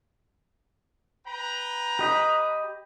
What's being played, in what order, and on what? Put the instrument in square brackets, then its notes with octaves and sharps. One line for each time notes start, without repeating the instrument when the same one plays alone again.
[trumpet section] B4 G5 A#5
[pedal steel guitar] G4 D#5 B5